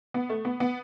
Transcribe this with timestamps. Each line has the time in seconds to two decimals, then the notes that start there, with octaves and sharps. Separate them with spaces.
0.14 B3
0.30 A3
0.45 B3
0.60 B3